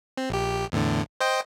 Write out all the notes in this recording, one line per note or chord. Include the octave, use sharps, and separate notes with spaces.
C4
A#1 G4
E2 A2 D3
C5 D#5 G5